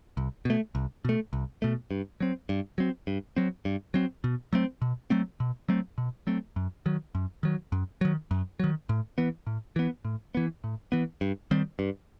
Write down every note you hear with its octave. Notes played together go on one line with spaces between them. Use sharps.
C2
B2 A3
C2
B2 A3
C2
B2 A3
G2
F#3 C4
G2
F#3 C4
G2
F#3 C4
G2
F#3 C4
B2
F#3 A3 C4
B2
F#3 A3 C4
B2
F#3 A3 C4
B2
F#3 A3 C4
F#2
D#3 F#3
F#2
D#3 F#3
F#2
D#3 F#3
F#2
D#3 F#3
A2
E3 B3
A2
E3 B3
A2
E3 B3
A2
E3 B3
G2
D#3 G3 C4
G2